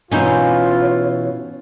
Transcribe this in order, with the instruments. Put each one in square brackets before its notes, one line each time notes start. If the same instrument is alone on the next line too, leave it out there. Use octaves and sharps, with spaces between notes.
[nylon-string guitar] B2 E3 B3 [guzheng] C#4 D#4 C5 [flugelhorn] F4 [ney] C#5